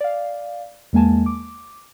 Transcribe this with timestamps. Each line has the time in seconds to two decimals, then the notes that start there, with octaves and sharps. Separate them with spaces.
0.01 D5 F5
0.93 E2 G#3 A#3 G#5 A5
1.26 D6